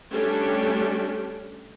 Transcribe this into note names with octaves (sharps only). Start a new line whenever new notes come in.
G3 A3 C#4 D4 G4